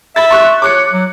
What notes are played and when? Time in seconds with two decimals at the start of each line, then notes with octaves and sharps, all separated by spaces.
0.16 E5 B5 A6
0.31 C6 C#6 F#6
0.62 C#5 D6 F#6 C#7
0.93 F#3